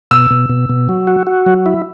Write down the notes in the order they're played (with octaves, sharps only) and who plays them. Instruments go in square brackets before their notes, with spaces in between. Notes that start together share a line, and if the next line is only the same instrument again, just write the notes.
[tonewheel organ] B2 [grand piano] E6
[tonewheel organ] B2
B2
B2
F#3
F#4
F#4
F#3
E4